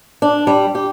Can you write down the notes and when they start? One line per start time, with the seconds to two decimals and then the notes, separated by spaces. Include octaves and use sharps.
0.22 D4
0.47 G3
0.75 G4